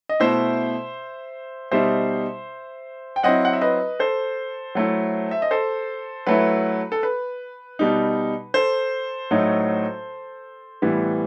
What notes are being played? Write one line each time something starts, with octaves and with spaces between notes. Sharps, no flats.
D#5
B2 A3 E4 C5 E5
B2 G3 D#4 C5 E5
G5
F#3 C4 E4 D#5 F#5
F#5
E5
B4 D#5
A4 C5
F#3 A3 E4
E5
D#5
A4 C5
F#3 A3 E4 B4
A4
B4
B2 G3 D#4
A4 C5
A2 F#3 A3 D#4
A2 E3 G3 B3